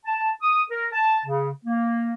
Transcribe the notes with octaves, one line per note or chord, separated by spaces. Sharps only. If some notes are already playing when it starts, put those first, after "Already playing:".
A5
D#6
A#4
A5
C#3
A#3